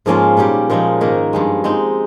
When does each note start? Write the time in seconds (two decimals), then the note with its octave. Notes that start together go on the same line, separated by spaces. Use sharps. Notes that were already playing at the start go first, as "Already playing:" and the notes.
0.06 G#2 F3 A#3 C#4 F4
0.37 A#2 G3 C#4 G4
0.70 A#2 F3 G#3 D#4
1.01 G#2 D#3 A#3
1.33 G2 F3 G#3
1.64 G#3 C4 D#4